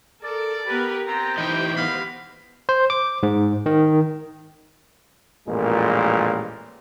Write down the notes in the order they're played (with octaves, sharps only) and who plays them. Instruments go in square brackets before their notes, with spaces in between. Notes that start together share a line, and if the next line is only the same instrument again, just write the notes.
[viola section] A4 [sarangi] A#4 [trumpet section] D5
[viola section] B3 A#4 B4 [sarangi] G4
[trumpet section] B3 C4 G5 [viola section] G4 C5 [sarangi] A#5
[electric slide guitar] E3 D#4 D#5 [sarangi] E4 [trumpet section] C#5 G5
[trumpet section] G#3 F5 B5 [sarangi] B3
[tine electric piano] C5
D6
G#2
D#3
[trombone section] A1 F2 A#2 G#3 F4 A#4